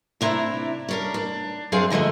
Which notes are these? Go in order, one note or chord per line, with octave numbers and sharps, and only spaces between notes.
C3 D4 E4 A#5
C#4 D4 A#4
D4
F#2 C4 D4 G#4 F5 F#5
F2 D3 G#3 A3 D#5